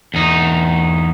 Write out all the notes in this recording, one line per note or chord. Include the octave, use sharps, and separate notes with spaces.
E2 D#4